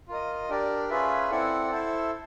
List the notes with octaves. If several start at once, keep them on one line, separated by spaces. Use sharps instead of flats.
F4 A#4 D#5
D4 G4 A#4 D5
C#4 F4 G#4 B4 E5
C4 E4 A4 D5 F#5
E4 A4 C5